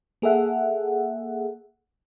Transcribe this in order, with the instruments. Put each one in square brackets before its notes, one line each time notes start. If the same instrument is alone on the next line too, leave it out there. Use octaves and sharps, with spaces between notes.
[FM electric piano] A#3 G#4 A4 E5 F#5